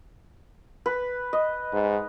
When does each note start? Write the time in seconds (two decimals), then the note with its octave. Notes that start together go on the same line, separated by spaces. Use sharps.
0.86 B4
1.33 D#5
1.73 G#2